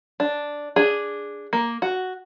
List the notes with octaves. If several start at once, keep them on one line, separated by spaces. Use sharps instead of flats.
D4
D4 G#4
A#3
F#4